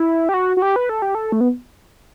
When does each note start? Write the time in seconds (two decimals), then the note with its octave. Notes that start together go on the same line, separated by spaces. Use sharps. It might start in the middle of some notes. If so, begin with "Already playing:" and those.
Already playing: E4
0.29 G4
0.34 F#4
0.57 F#4
0.62 G4
0.76 B4
0.89 A4
1.02 G4
1.15 A4
1.32 A3
1.41 B3